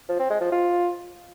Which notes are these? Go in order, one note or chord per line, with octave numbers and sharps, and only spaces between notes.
F3
C4
G#3
F3
F4